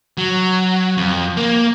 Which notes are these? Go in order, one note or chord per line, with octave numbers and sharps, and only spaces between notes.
F#3
F2
A#3